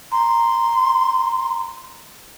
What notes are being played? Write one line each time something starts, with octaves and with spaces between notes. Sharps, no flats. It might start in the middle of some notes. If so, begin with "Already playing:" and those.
A#5 C6